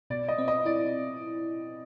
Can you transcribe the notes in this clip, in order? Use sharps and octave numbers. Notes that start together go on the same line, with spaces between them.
B2 D5
D#5
C4
D#5
E4 D5